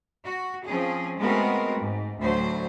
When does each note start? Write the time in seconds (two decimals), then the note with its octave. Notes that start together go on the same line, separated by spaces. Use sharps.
0.24 F#4
0.66 F3 C4 C#4 G#4
1.18 G#3 A3 B3 C4 F#4 A#4
1.80 G#2
2.19 D2 A2 F#3 C5